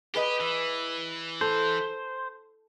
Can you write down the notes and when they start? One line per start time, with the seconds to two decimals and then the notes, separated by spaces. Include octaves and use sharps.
0.14 G4 G#4 B4 D#5
0.40 E3
1.41 A4 C5